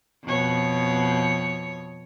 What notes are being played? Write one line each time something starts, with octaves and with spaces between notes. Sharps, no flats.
F2 B2 C#5